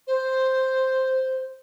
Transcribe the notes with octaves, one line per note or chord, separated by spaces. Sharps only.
C5